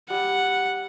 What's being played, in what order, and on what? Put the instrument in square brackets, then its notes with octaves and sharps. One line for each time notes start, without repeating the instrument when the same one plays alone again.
[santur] G3 [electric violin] F#5